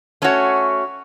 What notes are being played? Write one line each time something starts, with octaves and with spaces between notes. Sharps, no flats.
A3 C#4 F#4 C#5